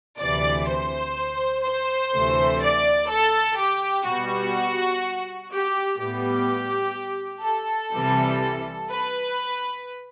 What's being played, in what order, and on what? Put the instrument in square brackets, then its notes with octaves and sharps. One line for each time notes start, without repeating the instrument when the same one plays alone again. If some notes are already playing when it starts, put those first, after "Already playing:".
[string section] D2 C3 E3 D5
C5
C5
D2 C3 E3 A3
D5
A4
G4
B2 G3 B3 F#4
G4
A2 G3 B3 G4
A4
C2 C3 E3 G3 C4
B4